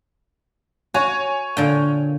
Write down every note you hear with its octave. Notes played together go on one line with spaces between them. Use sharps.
F#4 C#5 G#5
A#2 D3 G5